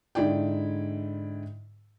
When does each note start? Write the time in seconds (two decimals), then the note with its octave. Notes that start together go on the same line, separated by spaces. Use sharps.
0.15 G#2 D3 E4 D5 G5